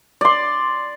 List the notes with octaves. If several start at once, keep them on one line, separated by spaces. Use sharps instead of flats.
D5 C6